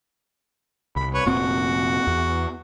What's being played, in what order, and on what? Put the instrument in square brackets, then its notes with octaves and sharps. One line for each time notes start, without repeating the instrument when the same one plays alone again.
[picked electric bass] C2 [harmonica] B5
[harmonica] B4 C#5
[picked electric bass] F1 A#2 C4 [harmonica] F#4
[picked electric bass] E2